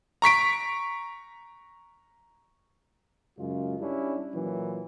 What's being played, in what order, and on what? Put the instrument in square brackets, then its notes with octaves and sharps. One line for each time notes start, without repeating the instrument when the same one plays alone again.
[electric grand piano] A#5 C#6 B6 D7
[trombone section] F#2 C#3 G#3 F4
G3 C#4 D4 E4
A#2 E3 F#3